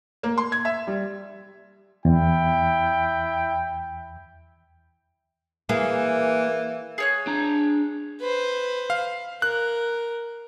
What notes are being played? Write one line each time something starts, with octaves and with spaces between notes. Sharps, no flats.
A#3
C6
G#6
E5
G3
E2 E4 G5
E3 A#3 G#4
G#4 C#5 F#6
D4 A#5
B4 C5
F5
A#4 F#6